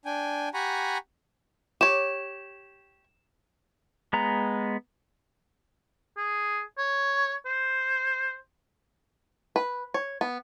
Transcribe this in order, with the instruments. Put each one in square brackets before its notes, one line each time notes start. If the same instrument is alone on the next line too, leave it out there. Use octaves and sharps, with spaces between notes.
[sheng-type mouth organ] D4 G5 G#5
G4 F#5 G#5 A#5 B5 C#6
[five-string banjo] G4 C#5 [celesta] E7
[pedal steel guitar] G#3 B3 A#5
[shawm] G#4
C#5
C5
[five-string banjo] B4
C#5
B3